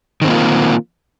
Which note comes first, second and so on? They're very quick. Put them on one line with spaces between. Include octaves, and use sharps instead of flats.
D#3 C4 A#3 F4